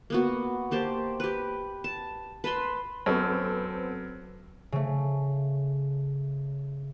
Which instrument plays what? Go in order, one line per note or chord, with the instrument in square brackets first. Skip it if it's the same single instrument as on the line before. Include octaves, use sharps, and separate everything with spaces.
[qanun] A#3 B3 F#4
A#3 G4 C5 A5
G4 B4
A5
B4 A5 B5 C6
[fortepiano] F#2 [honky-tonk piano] B3 C4 A4
[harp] C#3 A3